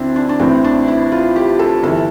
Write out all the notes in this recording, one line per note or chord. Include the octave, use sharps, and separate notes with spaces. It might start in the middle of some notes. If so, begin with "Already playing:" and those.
Already playing: D2 D3 C4 D4 E4
D4
D4
A1 A2 E3 C4
D4
E4
F4
G4
A4
G1 E3 A4